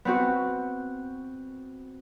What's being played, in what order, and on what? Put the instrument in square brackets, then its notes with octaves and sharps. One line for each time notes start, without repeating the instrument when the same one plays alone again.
[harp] B3 C4 F#4